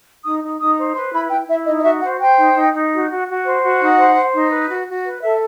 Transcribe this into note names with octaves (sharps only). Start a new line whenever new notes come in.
D#4 D#6
D#4
D#4 D#6
C5
B4 C6
E4 B5
E4 G5
E4 E5
D#4 D#5
D#5
F#4 E5
C5 F#5
C5 G5
D#4
D#4
D#4
F#4
F#4
F#4
C5
F#4
D#4 F#5
C5
C5
D#4
B4
F#4
F#4
B4
A4 E5